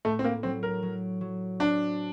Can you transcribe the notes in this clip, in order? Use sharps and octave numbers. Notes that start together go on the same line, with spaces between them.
A2 A3
C4
A#3
F#3 C4
A#4
F#3
F#3
C4 D4